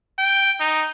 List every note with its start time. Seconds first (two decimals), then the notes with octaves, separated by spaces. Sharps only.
0.19 G5
0.60 D#4